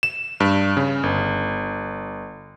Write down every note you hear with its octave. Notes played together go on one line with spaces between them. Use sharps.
E7
G2
C#3
G1